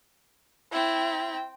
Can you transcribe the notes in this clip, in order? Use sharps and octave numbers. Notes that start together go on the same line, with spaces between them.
C4 E4 G5